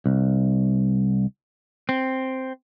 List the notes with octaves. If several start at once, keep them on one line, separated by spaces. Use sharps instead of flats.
C2
C4